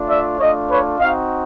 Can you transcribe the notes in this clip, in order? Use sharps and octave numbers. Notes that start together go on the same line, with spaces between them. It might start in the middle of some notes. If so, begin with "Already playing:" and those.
Already playing: A3 D4 F4
D5 E5
A3 D4 F4 C#5 D#5
B4 C#5
C4 D#4 F#4 D#5 F5